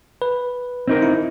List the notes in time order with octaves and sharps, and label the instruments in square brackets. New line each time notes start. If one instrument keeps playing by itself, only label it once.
[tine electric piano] B4
[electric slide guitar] C4 D#4 A#4
[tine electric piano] E4